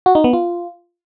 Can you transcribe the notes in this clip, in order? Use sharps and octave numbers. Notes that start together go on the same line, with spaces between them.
F#4
D#4
B3
F4